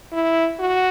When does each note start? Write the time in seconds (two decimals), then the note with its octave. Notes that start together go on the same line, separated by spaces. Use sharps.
0.13 E4
0.60 F#4